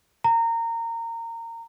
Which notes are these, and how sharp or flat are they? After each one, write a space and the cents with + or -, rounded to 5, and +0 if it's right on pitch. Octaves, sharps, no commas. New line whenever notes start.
A#5 -20